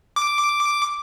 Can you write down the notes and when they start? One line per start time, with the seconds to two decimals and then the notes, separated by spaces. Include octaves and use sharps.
0.16 D6